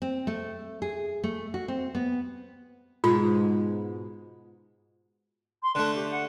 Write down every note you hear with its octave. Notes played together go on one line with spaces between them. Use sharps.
C4
A3
G#4
A3
F#4
C4
B3
G#2 B2 G#3 F4
C6
D3 A3 F#6
G4
F#5